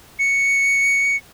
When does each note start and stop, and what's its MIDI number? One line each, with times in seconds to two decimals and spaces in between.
0.19 1.16 97